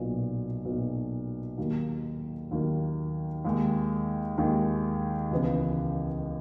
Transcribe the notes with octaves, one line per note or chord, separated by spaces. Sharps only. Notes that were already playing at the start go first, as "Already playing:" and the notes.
Already playing: B1 A#2 F#3 B3
B1 A#2 F#3 B3
D#2 D#3 F#3 A#3
D#2 D#3 F#3 A#3
D#2 D#3 G#3
D#2 D#3 G#3
C#2 C#3 E3 B3